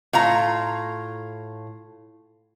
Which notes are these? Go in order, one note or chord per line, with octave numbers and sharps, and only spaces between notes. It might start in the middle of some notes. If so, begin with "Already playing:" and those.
A2 F4 A#5